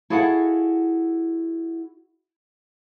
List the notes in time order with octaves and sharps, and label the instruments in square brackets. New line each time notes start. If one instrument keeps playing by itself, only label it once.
[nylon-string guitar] E4 F#4 G#4 A4 F5 F#5